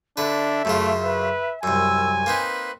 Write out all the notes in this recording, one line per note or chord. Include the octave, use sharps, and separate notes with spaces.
D3 D4 B4 E5
F#2 C#3 A3 F4
B4
C2 F#2 G#5 E6
A#3 C4 D#4 B4